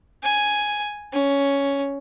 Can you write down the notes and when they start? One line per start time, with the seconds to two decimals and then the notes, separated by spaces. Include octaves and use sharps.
0.23 G#5
1.12 C#4